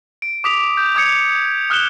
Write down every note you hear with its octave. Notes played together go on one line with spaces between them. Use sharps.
D7
D6 D#6 B6 F7
G6
D6 D#6 G#6 C#7
D#6 F6 F#6 C#7 E7 G7